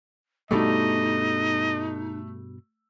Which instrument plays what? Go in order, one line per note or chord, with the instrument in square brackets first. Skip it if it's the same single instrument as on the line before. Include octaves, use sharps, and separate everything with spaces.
[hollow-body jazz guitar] G2 B2 G3 [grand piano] A3 [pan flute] D#4 [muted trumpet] D#5